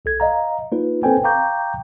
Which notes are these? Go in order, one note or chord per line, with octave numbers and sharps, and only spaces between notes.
B1 A4 G#6
D#5 F5 A#5
A#3 D#4 F4 B4
C4 A4 B4 C5 G5 G#5
F5 G5 A#5 C#6 D6 G6